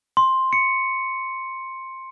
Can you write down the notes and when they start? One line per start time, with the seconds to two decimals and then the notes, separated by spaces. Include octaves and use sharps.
0.17 C6
0.53 C#7